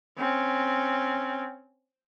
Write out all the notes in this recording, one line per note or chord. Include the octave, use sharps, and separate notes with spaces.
C4 C#4